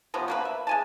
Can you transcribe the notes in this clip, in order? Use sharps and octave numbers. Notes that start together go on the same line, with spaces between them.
C3 F3 B3 C#4
B2 A#3 B4
E5
G#3 G#5 A5